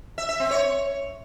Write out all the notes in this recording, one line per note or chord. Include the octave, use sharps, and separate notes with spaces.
E5
E5
C4
C#5